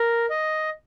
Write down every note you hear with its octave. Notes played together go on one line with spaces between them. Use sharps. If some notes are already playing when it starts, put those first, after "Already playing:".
Already playing: A#4
D#5